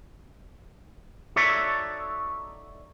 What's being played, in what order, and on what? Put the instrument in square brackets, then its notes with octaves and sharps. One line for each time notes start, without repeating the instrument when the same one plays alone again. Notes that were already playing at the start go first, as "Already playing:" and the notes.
[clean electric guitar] D#4 F#4 A4 C#5 D5 E5